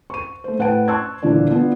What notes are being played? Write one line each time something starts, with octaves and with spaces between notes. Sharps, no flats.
C#6 D#7
A3 C5
A2 B4 F#5 G5 A5 D7
A5 C6 C#6 E6 F#6 G#6
D#1 A#2 D3 E3 D4 F4
B3 D4 F4